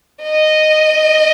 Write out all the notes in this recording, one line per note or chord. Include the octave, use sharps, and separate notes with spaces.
D#5